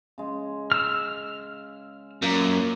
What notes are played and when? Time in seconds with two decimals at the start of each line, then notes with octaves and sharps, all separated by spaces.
0.18 C#3 G#3
0.72 E6 F6
2.22 F#2 A#2 A#3